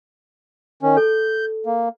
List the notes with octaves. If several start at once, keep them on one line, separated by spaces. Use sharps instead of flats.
D#3 C#4
A4 G6
A#3